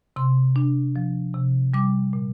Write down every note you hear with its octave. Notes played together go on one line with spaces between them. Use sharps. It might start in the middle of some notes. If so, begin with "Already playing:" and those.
C3 C6
D4
F3
C3
G3 D6
A#2